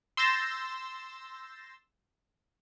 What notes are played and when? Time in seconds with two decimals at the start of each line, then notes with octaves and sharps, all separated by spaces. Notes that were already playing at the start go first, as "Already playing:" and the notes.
0.17 C6 E6 G6 A6 A#6 E7